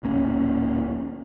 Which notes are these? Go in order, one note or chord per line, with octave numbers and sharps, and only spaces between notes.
D1 A#1 A#3 C#4